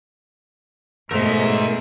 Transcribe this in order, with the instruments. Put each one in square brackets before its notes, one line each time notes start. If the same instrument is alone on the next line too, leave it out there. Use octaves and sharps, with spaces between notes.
[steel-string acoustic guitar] G#2 C5 D#5 [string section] B2 [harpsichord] A3 [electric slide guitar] A#4 E5